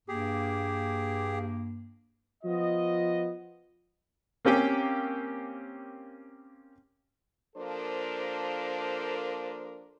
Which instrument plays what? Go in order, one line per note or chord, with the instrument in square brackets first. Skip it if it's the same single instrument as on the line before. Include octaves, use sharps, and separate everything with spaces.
[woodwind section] G2 A#3 [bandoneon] G4 G#4
[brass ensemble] F3 B3 F4 D#5
[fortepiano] A#3 C4 C#4 G4 G5
[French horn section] F3 A#3 D4 A4 A#4 C5